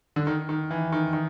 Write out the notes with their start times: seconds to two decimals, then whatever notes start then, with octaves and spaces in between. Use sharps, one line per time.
0.16 D3
0.27 D#3
0.49 D#3
0.71 E3
0.92 D#3
1.13 D#3